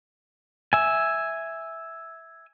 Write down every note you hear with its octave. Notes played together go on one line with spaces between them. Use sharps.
E5 G#5